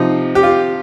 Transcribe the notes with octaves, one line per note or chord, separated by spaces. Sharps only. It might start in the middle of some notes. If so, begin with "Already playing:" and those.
Already playing: C3 F3 D#4
G4
F4